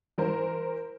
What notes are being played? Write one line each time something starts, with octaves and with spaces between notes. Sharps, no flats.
E3 A#4 C5